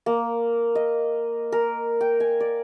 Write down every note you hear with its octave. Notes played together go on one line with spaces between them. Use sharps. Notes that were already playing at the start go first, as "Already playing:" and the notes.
A#3
D#5
A#4
G5
G#5
D5